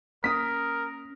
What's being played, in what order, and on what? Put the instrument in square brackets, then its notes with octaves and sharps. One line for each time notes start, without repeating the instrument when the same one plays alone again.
[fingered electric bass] A#3 C#4 [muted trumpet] A#4 [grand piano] D#6 B6